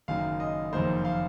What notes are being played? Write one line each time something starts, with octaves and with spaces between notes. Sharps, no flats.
F#1 F#2 D#3 F5
D#5
F#1 F2 D#3 A#3 C5
F5